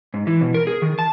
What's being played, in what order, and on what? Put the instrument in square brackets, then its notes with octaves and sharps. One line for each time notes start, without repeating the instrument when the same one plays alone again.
[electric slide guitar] G#2
E3
B2
A#4
G#4
D#3
A5